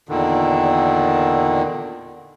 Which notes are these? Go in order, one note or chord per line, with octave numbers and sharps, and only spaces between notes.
E2 A#2 D3 D#3